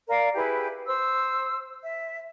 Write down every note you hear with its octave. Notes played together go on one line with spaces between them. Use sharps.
A#4 D5 F5
E4 G4 G#4 B4
C5 E6
E5